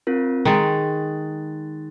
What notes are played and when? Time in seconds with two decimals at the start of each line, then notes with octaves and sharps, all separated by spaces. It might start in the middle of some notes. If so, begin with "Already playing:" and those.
0.07 C4 F4 A#4
0.45 D#3 G#3 F#6 A6